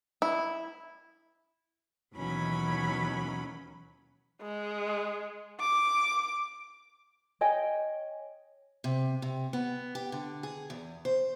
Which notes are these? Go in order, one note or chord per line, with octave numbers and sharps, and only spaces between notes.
E4
D#2 B2 E3 F#3 C#4 B5
G#3
D6
C#5 D#5 G5 G#5
C3
C3
B3
G4
D3
G#4
E2
C5